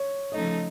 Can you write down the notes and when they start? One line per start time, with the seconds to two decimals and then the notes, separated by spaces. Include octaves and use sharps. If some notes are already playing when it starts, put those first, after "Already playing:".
Already playing: C#5
0.32 C#3 F3 A3 D#4 A4 D#5